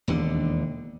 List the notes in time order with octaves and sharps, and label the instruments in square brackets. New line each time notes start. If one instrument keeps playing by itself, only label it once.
[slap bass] E1 D#2 D3